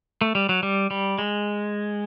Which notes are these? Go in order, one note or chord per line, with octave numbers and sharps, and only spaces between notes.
A3
G3
F#3
G3
G3
G#3